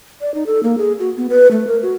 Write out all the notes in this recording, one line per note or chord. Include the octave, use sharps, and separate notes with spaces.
D5
D#4
A4
A#3
G#4
F#4
B3
B4
A3
A#4
F#4